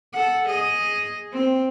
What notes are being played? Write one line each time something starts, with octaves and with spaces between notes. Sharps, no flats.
A4 F#5
G#4 D#5
C4